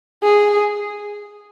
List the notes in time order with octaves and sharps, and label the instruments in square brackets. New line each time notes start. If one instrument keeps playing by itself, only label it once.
[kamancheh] G#4